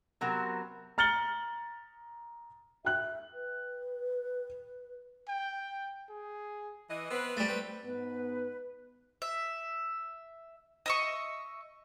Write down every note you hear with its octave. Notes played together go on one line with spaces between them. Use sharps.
C3 F#3 B3 C4 A#4
A#5 F6 A6 C#7 F#7 G7
E5 G5 F#6
B4
G5
G#4
E3 D#5
B3 C4 B4
G3 A3
C4 B4
G#2 B3 B4
E5
D#5 E5 C#6